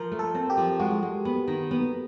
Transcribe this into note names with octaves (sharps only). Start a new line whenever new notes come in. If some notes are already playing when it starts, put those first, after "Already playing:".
Already playing: F3 A#4
A3
A4
C4
G4
F3
G#3 F#4
G#3
B3
D#3
B3